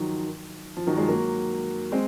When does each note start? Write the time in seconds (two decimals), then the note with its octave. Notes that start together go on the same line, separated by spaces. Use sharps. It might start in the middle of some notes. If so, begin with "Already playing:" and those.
Already playing: D#3 F3 F#3
0.77 F3
0.87 D#3 F#3
0.97 F3 G#3
1.08 F#3 A#3
1.92 G#3 C4